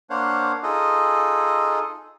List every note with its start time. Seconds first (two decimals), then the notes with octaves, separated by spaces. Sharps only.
0.10 A#3 D4 C5 C#5 F5 F#5
0.63 D#4 F4 G#4 A4 D#5